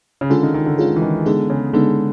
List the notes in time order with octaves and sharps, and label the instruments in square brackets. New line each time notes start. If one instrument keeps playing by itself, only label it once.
[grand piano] C#3
[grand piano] D3 [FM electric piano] G#3 C#4 F4 G#4
[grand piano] D#3
D#3
D3
[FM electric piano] G#3 C#4 F4 G#4
[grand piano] E3
D#3
[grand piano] D3 [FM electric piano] G#3 B3 D#4 G#4
[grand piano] C#3
[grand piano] D3 [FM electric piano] G#3 B3 D#4 G#4